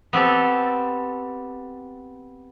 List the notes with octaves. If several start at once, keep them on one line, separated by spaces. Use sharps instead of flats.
B3 C4 G4 A4